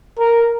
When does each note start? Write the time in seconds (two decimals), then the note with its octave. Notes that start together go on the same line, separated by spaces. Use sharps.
0.19 A#4